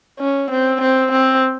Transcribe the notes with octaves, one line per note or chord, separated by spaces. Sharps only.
C#4
C4
C4
C4